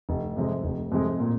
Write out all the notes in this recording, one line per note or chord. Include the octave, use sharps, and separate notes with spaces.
F1
F2 C3 G#3
F1
F2 C3 G#3
A#2